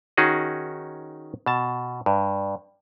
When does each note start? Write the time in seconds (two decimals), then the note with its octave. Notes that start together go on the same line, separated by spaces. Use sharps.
0.17 D#3 C#4 D#4 F#4 G#4
1.46 B2 A5
2.06 G2